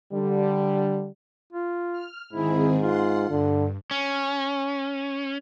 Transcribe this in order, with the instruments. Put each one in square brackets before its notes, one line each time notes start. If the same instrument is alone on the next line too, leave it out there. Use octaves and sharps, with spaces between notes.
[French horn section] D3 G3
[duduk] F4
[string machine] F6
[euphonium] G#2 [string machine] D#3 C4 G#4 [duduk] E4
[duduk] F4 [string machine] F#5 C6
[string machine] G2 [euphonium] D3
[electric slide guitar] C#4